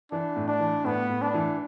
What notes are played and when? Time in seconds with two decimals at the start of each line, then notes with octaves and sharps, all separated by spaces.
0.11 E3 D4
0.36 A2
0.48 D4
0.60 E3
0.84 A2 B3
1.09 A2
1.22 D4
1.34 E3